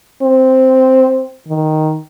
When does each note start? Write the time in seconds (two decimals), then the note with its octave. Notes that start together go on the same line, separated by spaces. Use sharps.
0.23 C4
1.48 D#3